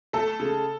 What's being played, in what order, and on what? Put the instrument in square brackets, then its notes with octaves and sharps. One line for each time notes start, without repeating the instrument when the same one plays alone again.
[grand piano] A3 [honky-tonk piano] A4
[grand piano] C#3